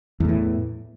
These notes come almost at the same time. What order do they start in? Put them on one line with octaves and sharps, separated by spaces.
E2 A2 E3